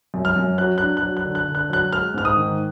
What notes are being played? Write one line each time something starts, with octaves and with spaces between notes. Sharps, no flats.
F#2
F6
F#2
F#3 F#6
D4 F#6
F#6
F#3
F#6
D3
F#6
D3
F#6
F#3 F#6
G#3 F6
G#2 F6
D#6
D#3